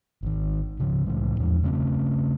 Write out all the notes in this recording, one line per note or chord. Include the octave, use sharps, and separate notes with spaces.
G#1 D#3
C#2 G#2 C#3
C2 A2 E3 G#3
E2 F3 D4
C#3 A3 C4 C#4